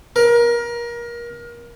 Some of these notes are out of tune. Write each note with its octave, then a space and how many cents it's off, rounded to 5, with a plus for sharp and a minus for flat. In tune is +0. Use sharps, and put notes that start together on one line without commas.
A#4 +25